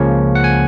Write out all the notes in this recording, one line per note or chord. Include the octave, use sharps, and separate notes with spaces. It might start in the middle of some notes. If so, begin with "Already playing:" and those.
Already playing: C#2 C#3 F3 A#3 C#4 C#5
F#5
G#5